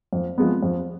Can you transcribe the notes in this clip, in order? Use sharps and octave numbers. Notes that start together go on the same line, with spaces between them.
F2
F3 G#3 B3
F2